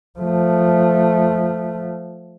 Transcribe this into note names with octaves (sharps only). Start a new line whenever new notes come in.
F3 A3